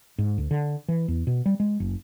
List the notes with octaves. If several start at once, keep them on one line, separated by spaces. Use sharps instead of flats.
G#2
D2
D3
E3
E2
B2
G3
G#3
F#1